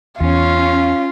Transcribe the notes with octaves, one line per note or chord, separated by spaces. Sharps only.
E2 C#4 F4